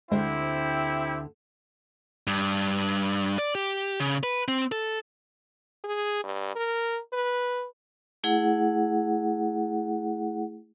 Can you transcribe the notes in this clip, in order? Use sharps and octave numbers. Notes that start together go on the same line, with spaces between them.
D2 D3 G#3 C4 E4 G4 C5
G2
D5
G4
C#3
B4
C4
A4
G#4
G2
A#4
B4
A3 E4 G#4 F#5